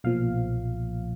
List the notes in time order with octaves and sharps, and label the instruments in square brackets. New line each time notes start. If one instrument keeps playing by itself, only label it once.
[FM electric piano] B1 A#2 F3 F5